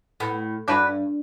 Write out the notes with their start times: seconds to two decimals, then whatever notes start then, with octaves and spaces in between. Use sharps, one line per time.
0.20 A2 B3
0.68 G2 D4 F#4 B4